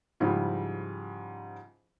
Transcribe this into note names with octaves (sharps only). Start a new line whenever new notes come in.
G#2 C#3 F3 G3 E4